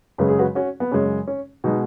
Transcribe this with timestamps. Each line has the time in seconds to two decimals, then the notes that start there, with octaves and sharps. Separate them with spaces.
0.18 F#2 C#3 G#3 B4
0.28 G#4
0.39 F#4 B4
0.55 C#4 F#4
0.80 B3
0.91 F#2 C#3 G#3 C#4
1.27 C#4
1.64 B2 G#3 B3 D#4